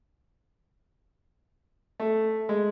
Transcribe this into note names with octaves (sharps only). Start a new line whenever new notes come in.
A3
G#3